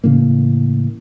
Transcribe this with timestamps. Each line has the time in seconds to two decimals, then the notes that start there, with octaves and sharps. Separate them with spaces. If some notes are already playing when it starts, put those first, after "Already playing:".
0.04 A2 C#3 E3 A#3